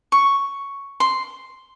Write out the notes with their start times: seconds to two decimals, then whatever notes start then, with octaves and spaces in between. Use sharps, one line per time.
0.12 C#6
1.00 C6